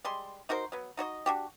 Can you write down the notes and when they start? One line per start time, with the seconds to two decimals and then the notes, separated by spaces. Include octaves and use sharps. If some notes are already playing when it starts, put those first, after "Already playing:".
0.04 G3 G#3 C6
0.49 D#4 F#4 A#4 C5
0.72 F#3 B3
0.97 D#4 F#4 C#5 D#5
1.26 D4 F#4 G4